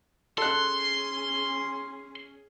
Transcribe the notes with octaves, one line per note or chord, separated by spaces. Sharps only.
C#4 G#4 A4 C6 F#6